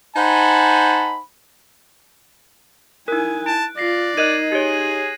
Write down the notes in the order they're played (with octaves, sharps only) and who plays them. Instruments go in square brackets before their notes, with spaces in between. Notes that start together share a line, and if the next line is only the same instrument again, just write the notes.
[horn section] D#4 C5 F#5 G#5 A5 B5
[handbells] D#4 A#4 [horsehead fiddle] E4 G#5 [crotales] F#6
[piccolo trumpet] A5 [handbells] D7
[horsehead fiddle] F4 [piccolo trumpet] D5 [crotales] A#6 C7
[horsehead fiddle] D#4 [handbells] A#4 D#5 F#6 [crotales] G#6 D#7 F#7
[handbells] G4 C#5 [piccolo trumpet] G#4